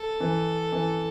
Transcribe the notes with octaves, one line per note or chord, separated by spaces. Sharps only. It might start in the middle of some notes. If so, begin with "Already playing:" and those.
Already playing: A4
E3
E3